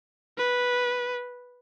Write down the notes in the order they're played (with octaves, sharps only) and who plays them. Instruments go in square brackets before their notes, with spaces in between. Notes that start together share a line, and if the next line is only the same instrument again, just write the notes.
[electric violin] B4